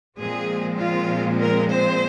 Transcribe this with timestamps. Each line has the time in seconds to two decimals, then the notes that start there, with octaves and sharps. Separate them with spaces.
0.18 A#2 F3 G#3 C4 G#4
0.80 F4
1.41 A#4
1.72 C5